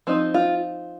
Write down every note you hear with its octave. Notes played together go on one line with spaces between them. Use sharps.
F3 C4 D#4
F4